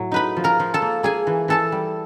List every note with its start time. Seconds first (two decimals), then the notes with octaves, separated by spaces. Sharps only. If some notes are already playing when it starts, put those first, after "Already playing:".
Already playing: A2 F#3
0.12 D#4 B4 B5
0.37 F3
0.44 A#4 A#5
0.59 F3
0.74 A4 A5
0.82 A#3
1.03 A#3 G#4 G#5
1.27 E3
1.48 E3 A4 A5
1.72 G3